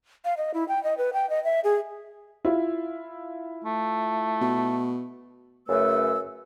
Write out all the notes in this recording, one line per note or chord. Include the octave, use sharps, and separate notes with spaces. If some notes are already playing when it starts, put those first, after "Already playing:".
F5
D#5
E4
G5
D#5
B4
G5
D#5
E5
G#4
E4 F4
A3
B2
F#2 C#3 A3 B4 E6